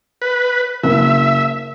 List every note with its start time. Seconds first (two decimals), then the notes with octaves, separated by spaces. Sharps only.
0.22 B4
0.84 F#1 E5